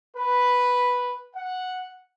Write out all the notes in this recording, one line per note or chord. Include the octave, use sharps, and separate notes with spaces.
B4
F#5